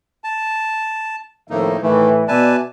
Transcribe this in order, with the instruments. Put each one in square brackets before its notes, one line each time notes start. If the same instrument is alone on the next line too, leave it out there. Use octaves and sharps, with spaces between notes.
[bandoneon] A5
[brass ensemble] F2 D#3 E5 [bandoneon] A2 A#3 D#4
[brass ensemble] A2 E3 [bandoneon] D#3 A3
[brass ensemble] B2 D5 E5 [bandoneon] B4 G#5 A5